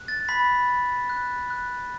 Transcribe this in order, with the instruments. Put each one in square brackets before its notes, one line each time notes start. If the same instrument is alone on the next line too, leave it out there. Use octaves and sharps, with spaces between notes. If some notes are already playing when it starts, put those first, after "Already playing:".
Already playing: [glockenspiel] F#6
A6
B5 B6
B5
F#6
F#6